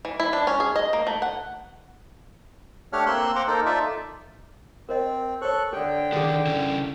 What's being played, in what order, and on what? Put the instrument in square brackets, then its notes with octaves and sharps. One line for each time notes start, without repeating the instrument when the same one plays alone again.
[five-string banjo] E3
E4
D4
C#4
G#4
D#5
A#3
A3
F#5
[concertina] A3 D4 G4 C#5 F#5 F6
A#3 C4 C6 E6 F#6
C5 F#5 G5 A#5 C6 D6
A#3 D#4 A4 A#4 C5
D#4 F4 A4 D5 E5
[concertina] C4 [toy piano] A#4 C5 D#5
[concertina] A4 C#6 F#6 [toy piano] C5 C#5
[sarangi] D3 [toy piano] A4 [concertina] G5
[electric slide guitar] D#3 D4 [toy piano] G#4 A4
[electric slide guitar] C#3 C#4 E4